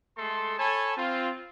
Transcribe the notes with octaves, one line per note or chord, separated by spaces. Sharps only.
G#3 A3 A4 C6
A4 C#5 G#5 A5 B5
C4 F4